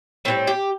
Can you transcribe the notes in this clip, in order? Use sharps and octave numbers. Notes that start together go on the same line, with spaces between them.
A2 E3 G3 C4
G4